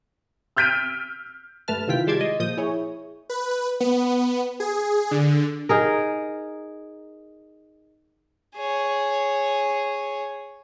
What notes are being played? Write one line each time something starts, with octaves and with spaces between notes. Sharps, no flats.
E6 F6 G6 B6 D7 D#7
G2 A3 B4 A5 F6
C3 D#3 E4 F4 G5 B6
G3 G#3 A5 C6 D6 G#6
D#5
A#2 F3 D#6 G6
E4 G#4 C#5
B4
B3
G#4
D3
D#4 G#4 A#4
G#4 C#5